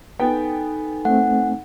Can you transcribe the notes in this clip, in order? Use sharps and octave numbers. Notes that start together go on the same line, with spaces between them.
B3 D#4 A4 G5 G#5
A3 C4 F#5